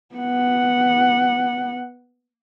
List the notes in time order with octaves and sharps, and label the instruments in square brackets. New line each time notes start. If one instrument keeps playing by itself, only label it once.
[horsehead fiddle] B3 F#5